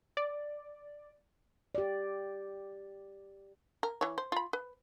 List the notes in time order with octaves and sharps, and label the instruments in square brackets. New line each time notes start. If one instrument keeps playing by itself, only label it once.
[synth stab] D5
[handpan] G4 D5
[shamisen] A#4
E3 C#5
C5
F4 B5
B4